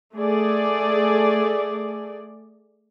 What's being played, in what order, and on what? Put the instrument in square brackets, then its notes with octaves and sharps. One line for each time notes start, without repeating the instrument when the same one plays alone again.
[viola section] A3 G#4 D5